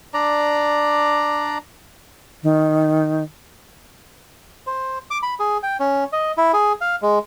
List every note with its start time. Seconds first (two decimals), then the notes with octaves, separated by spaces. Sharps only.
0.14 D4 D5 A#5
2.43 D#3
4.67 C5
5.11 D6
5.23 B5
5.39 G#4
5.63 G5
5.80 C#4
6.12 D#5
6.38 E4
6.53 G#4
6.81 F5
7.02 G#3